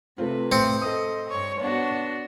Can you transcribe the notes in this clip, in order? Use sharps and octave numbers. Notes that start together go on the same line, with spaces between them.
C3 A3 C4 F4 B4
A2 C4 C#7
A4 D#5 D#6
G2 C#5 C#6
B3 D4 F#4 C#5